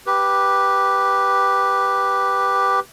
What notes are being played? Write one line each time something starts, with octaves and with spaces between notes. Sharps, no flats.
G4 B4